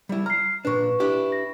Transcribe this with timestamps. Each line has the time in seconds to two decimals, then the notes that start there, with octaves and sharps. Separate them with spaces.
0.09 G3 E4
0.26 A#5 F6 C7
0.65 A#2 D4 B4 C#6
1.00 D4 E4 G4
1.32 A#6